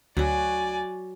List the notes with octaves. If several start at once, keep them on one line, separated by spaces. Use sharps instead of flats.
D2 F#3 F#4 D5 G#5